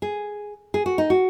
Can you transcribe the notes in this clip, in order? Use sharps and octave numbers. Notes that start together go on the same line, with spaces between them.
G#4
G#4
F#4
D#4
F#4